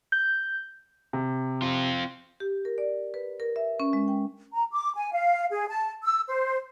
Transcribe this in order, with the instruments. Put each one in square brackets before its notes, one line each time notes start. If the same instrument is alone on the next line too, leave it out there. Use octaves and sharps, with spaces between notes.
[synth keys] G6
[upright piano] C3
[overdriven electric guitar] C4 F4
[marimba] G4
A#4
D5
B4
A#4
E5
C#4
G#3
G5
[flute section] A#5
D6
G#5
F5
G#4
A5
E6
C5